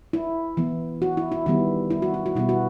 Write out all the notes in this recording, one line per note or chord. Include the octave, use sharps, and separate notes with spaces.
E4
E3 B3
F#4
E4
E4
D#3 G3 B3 E4
E4
F#4
E4
F#4
B2 G3 B3 E4
F#4